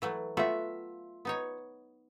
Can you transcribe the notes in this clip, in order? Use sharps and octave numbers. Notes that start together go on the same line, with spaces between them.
E3 F#3 A3
A3 B3 F4 F#4 E5
B3 D#4 C#5